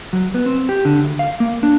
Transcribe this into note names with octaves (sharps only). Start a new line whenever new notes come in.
F#3
B3
C4
G4
D3
D2
F5
A#3
D4